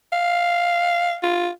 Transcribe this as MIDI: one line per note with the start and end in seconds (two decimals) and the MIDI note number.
0.12 1.17 77
1.23 1.49 65